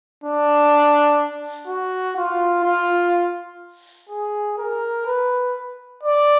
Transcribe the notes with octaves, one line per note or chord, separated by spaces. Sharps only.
D4
F#4
F4
F4
G#4
A#4
B4
D5